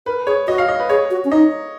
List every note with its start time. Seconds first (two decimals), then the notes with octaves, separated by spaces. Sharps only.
0.06 A#4 B4
0.27 G#4 C#5
0.48 F#4 D#5
0.58 F5
0.68 D#5
0.79 B4
0.89 G#4 C#5
1.11 F#4
1.25 C#4
1.31 D#4 D#5